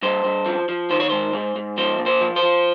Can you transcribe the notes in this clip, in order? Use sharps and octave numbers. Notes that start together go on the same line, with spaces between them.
G2 C5
G2
F3
F3
D#3 C5
C#5
G#2 C5
G#2
G#2
F3 C5
A#2
C5
F3
C5
F3